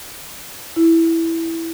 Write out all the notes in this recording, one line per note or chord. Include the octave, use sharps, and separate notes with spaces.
E4